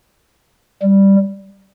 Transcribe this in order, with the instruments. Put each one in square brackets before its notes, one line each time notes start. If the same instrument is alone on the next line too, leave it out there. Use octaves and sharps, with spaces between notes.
[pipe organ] G3